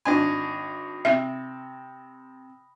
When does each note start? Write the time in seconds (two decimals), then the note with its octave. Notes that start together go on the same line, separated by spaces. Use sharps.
0.05 G#1 D4 G#5 B5 D#6 A#6
1.05 C3 E5